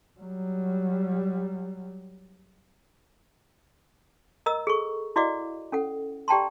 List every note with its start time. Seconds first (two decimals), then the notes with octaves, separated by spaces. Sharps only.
0.19 F#3 G3
4.46 A#4 D#5 A#5 E6
4.67 G#4 A4 C#6
5.16 E4 F#4 D5 D#5 F5 D6
5.72 C#4 A4 F#5
6.28 G4 D5 G5 A5 A#5 C6